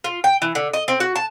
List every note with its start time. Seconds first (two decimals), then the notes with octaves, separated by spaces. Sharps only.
0.04 F4
0.24 G5
0.42 E3
0.55 D3
0.73 D#5
0.88 C4
1.00 F#4
1.16 A5